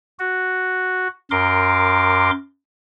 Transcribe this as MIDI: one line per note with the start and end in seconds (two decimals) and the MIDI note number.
0.19 1.08 66
1.31 2.31 42
1.31 2.31 70
1.31 2.31 84
1.31 2.31 86